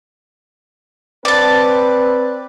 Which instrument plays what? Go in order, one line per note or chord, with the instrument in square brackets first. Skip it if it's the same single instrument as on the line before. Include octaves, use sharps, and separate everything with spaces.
[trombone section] C4 B4 [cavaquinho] D5 A5